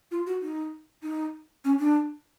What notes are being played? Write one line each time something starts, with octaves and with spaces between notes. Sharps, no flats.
F4
F#4
D#4
D#4
C#4
D4